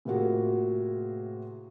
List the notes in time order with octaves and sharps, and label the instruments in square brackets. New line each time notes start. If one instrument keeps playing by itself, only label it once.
[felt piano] A2 C3 A#3 F4 F#4 G#4